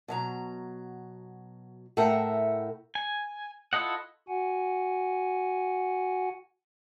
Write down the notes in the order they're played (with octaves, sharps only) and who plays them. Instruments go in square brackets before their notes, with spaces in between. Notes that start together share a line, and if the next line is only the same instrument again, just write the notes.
[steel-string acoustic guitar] B2 F#3 A#5
A2 A4 A#4 E5 F#5 G5
[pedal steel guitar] G#5
E4 F4 A4 D#5 F#5
[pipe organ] F#4 F#5 G#5